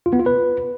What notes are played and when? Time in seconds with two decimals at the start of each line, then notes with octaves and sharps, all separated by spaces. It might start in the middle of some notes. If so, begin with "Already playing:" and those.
0.06 F4
0.13 B3
0.20 F4
0.26 B4